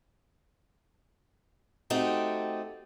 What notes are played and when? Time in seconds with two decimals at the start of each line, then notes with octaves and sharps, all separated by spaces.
1.90 A3 C4 D#4 F#4 G4